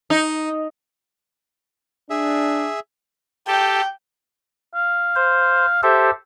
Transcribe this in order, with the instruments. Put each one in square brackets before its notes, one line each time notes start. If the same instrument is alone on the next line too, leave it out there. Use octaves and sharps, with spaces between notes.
[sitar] D#4
[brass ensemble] D4 [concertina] G#4 E5
[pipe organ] G4 A4 [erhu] G5
[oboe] F5
[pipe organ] C5
[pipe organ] G4 A4 C5 [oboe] E5